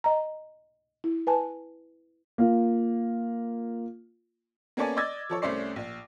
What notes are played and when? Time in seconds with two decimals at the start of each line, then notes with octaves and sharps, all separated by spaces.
0.04 D#5 A#5
1.04 E4
1.27 B4 G#5 A5
2.38 A#3 F4
4.77 A#3 B3 C#4 A4 D5 G#5
4.97 D5 D#5 D6 E6 G#6 A6
5.29 F3 A4 C#5
5.42 C2 A3 C#4 C5 D5 C7
5.76 A#1